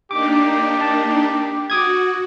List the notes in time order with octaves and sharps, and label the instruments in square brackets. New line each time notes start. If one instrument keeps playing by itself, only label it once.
[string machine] A#3 D4 D#4 [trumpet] G4 [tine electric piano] D6
[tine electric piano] A5
[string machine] F#4 [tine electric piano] D6 D#6 G#6